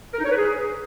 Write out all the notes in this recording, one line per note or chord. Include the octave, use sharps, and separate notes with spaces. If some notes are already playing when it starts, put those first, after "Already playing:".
A#4
D#4
C#5
B4
G#4